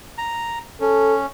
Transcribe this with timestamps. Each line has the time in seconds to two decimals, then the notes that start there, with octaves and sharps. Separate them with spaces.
0.18 A#5
0.81 C#4 A4